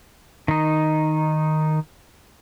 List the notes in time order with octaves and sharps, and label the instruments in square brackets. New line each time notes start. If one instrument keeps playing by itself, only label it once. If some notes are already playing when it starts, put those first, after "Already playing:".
[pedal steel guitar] D#3 D#4